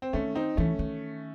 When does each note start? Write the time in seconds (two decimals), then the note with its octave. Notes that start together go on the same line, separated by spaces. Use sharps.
0.02 C4
0.13 D#3 A3 C#4
0.35 C4 D#4
0.57 E3 A3 C#4
0.79 D#3